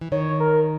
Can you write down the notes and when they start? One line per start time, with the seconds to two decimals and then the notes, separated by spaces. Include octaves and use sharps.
0.01 E3
0.12 D#3 C#5
0.40 A#4